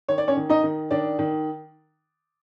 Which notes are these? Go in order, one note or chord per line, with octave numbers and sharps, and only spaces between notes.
D#3 C#5
D5
C#4 C#5
D#3
D#4 D#5
D#3
D#3 D4 D5
D#3